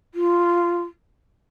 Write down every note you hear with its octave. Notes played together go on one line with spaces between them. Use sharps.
F4